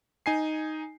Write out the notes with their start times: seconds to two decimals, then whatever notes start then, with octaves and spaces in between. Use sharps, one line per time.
0.26 D#4 G#5 C7